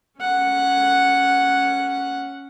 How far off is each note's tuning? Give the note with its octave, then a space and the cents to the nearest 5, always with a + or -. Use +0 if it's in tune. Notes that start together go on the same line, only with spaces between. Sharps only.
C#4 +0 F#5 -5